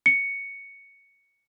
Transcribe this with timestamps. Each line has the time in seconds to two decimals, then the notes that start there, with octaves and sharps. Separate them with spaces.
0.06 C#7